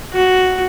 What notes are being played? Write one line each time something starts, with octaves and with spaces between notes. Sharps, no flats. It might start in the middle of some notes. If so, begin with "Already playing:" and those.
F#4